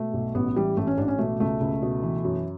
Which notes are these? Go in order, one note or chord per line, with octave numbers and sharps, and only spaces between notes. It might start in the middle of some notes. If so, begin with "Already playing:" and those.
Already playing: B2 A3
B1
A1 B3
E3 G3
A1 A3
C#4
A1 D4
C#4
B2 A3
C#2 A3
C#2
B2
E3
F#2